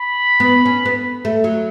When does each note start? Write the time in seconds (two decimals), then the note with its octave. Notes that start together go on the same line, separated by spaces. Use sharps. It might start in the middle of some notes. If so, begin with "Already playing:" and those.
Already playing: B5
0.40 B3
0.66 C#4
0.86 B3
1.25 A3
1.44 F#3